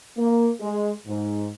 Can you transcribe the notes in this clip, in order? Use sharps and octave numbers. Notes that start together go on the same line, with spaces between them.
A#3
G#3
G#2